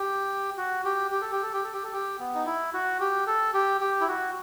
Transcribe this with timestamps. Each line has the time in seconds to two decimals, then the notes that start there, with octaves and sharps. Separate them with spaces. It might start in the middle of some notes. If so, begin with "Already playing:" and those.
Already playing: G4
0.57 F#4
0.85 G4
1.11 G4
1.21 A4
1.32 G4
1.42 A4
1.53 G4
1.63 A4
1.73 G4
1.84 A4
1.93 G4
2.20 B3
2.35 D#4
2.46 E4
2.73 F#4
3.00 G4
3.27 A4
3.54 G4
3.81 G4
4.01 E4
4.08 F#4